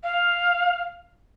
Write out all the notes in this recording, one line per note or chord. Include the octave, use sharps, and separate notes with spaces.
F5